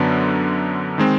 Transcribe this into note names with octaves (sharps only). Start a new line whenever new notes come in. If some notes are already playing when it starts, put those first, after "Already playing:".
Already playing: F#2 D3 F#3 B3 D4
D#3 G#3 C4